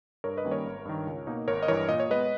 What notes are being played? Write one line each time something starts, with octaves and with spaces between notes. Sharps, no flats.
G2 A#4 C#5
B4 D#5
D#3 G3 A#3 C#4
A#4 C#5
G#1
G2 D#3
C#2
B2 A#3 D#4
G#1 A#4 C#5
D#5
G2 E3 A#4 C#5
A#2 D#5
C#5
G#3 B3 B4 D#5